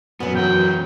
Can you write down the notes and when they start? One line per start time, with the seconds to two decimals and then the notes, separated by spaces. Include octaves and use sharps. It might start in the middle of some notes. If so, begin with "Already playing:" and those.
0.20 F#2 F#3 B3
0.34 E2 F#4 G5